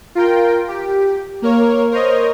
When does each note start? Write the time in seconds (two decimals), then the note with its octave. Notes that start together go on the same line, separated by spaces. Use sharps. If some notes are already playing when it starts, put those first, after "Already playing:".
0.15 F4 A#4 G5
0.68 G4
1.42 A#3 A#4 C#5
1.91 A#4 C5 C#5 D#5 A#5